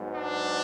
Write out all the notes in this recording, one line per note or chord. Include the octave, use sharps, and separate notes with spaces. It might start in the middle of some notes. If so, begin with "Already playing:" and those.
Already playing: G#2 F#3 B3
D4